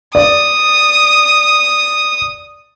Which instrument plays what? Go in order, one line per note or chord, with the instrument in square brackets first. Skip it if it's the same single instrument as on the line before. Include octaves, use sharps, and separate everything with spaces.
[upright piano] D5 [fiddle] D#6